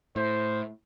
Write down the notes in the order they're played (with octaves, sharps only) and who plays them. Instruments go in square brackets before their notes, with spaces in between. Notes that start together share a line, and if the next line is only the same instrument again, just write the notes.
[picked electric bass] A2 [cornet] C5